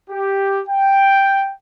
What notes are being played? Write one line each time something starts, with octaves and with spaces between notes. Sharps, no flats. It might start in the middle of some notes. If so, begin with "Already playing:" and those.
G4
G5